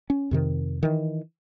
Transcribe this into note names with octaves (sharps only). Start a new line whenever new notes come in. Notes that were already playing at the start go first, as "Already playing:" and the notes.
C#4
F2 C3 D#3
D#3 E3